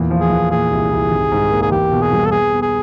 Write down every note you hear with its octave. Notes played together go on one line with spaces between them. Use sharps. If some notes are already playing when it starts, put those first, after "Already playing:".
Already playing: E2 A#2
F3
G#4
E2
A#2 G#4
C2
C2
G#1
G#2
A#3
G#4
E2 G4
B2
G#4
G3
A4
B3 G#4
B3
G#4